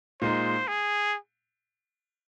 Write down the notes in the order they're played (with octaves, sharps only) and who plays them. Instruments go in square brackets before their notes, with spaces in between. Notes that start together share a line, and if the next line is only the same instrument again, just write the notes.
[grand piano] A#2 G#3 D#4 [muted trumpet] C5
[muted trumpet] G#4